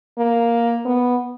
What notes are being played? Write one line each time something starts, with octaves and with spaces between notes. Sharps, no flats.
A#3
B3